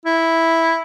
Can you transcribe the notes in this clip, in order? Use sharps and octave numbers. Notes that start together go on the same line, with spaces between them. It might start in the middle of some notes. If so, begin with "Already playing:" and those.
E4